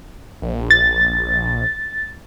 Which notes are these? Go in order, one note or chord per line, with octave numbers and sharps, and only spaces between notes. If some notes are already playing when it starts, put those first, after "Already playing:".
A#1
A6